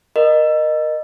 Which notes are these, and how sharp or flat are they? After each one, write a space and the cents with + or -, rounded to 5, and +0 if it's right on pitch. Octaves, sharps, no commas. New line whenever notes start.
A#4 +15 D#5 -20